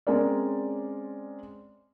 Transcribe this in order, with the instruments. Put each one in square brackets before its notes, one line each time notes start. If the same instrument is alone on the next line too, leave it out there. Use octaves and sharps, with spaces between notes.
[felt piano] G#3 C4 C#4 A#4 D5